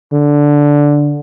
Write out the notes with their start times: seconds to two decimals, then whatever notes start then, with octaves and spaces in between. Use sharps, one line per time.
0.13 D3